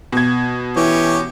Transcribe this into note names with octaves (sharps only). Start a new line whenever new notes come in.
B2 G#6
E3 C#4 G4 C#5